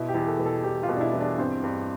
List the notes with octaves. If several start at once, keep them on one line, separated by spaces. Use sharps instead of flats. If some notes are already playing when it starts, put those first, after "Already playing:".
Already playing: B2 E4
G4
E2
A4
B2
A4
E2 G4
F4
B2
D4
E4
E2
D4
G2 C4
G2